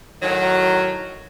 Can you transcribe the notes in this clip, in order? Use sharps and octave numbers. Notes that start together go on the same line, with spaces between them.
A2 D#3 F#3